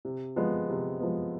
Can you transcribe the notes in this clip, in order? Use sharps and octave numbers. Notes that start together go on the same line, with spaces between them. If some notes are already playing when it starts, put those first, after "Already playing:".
C3
F3 G#3 B3
C3
F3 G#3 B3